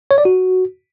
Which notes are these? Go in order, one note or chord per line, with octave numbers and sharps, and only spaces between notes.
C#5
D5
F#4